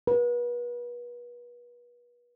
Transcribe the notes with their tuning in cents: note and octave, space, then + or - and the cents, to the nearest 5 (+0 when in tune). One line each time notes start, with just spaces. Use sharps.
B4 -35